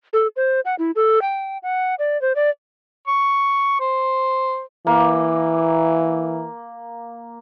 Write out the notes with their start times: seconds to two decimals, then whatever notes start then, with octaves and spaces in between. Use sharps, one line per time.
0.13 A4
0.36 C5
0.65 F#5
0.79 E4
0.96 A4
1.22 G5
1.63 F#5
1.99 D5
2.22 C5
2.36 D5
3.08 C#6
3.80 C5
4.87 E3 A#3